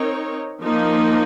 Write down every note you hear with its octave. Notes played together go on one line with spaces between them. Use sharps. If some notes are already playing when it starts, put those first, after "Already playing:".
Already playing: C4 D#4 A#4 C#5
F3 A#3 D#4